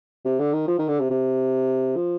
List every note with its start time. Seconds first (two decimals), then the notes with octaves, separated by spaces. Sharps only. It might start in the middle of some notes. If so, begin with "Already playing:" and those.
0.25 C3
0.39 D3
0.53 D#3
0.68 F3
0.79 D#3
0.88 D3
1.00 C3
1.10 C3
1.96 F3